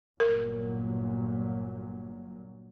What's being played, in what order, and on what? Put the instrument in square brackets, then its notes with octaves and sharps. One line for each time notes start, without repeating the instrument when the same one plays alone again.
[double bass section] G1 A#2 F#3 [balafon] A#4